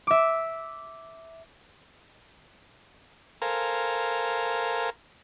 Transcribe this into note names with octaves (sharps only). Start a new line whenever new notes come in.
E5 D6
A4 A#4 C5 F5 G#5 A#5